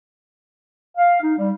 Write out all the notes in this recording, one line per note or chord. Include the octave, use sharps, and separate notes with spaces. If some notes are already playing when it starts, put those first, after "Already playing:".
F5
D#4
G3